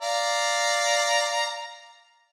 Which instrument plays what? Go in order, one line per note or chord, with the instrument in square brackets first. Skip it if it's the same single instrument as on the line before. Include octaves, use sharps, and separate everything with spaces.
[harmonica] D5 F5 A#5